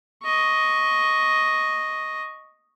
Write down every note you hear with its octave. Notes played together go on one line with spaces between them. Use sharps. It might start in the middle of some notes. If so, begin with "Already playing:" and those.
D#5 C#6